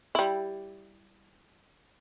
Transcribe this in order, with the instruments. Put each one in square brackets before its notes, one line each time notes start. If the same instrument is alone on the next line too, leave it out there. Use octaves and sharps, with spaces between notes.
[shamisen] G3 E4